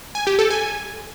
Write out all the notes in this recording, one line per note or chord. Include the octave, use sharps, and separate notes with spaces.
G#5
G4
A4
G#5